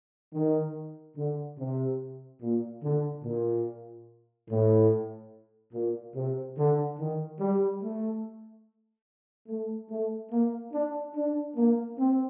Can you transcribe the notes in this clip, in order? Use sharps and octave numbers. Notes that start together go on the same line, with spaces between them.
D#3
D3
C3
A#2
D3
A#2
A2
A#2
C3
D3
D#3
G3
A3
A3
A3
A#3
D4
D4
A#3
C4